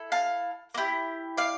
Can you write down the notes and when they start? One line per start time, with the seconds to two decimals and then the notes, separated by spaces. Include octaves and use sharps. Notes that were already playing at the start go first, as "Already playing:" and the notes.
Already playing: E4 A4
0.12 F5 A5
0.74 A#3
0.78 E4 G4
1.37 D5 F5